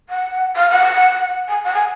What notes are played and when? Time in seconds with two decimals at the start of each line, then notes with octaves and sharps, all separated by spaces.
0.09 F#5
0.55 F5
0.70 F#5
1.48 G#5
1.64 F#5
1.74 G#5